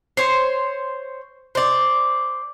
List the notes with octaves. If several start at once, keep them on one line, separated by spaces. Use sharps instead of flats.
C5 C#5
C5 D5